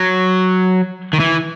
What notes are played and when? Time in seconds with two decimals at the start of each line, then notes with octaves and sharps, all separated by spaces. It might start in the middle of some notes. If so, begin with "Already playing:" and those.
Already playing: F#3
1.13 D#3
1.20 E3